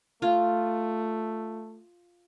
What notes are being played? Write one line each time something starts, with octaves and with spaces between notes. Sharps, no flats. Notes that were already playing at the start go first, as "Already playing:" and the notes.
A3 F4